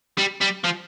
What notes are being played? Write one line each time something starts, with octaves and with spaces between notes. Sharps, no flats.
G3
G3
F3